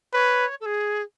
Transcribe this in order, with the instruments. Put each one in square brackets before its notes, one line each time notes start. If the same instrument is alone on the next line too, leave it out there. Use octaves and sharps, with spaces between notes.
[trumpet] B4 [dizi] C#5
[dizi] A4
G#4